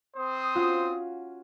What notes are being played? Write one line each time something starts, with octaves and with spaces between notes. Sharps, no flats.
C4 C5 D#6
C#4 F4 F#4